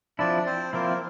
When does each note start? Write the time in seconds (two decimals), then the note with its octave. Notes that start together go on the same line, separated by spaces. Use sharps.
0.19 F3 C4 D4 E4 D5
0.46 C4 C5
0.73 F3 A#3 C4 E4 A#4